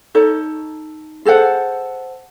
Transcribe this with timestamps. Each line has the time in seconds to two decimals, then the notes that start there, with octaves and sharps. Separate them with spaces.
0.15 D#4 A4 C#5
1.25 G#4 A4 C5 F#5